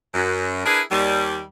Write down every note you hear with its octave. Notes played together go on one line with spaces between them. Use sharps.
F#2
D4 E4 G#4 A#4 B4
D#2 G3